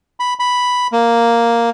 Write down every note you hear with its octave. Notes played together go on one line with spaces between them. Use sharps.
B5
B5
A#3